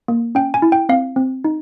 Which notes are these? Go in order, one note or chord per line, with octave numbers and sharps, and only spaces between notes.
A#3
C#4 G5
G#5
E4
G5
C4 F5
C4
D#4